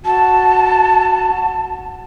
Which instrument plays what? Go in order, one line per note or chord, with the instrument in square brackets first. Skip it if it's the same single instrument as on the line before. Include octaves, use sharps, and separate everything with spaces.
[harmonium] F#4 [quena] A5